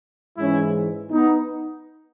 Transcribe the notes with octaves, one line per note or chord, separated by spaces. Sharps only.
G#2 E3 G#3 C#4 E4
B3 D#4